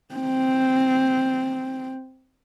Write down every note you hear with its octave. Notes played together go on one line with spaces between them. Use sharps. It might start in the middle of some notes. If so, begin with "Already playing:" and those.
C4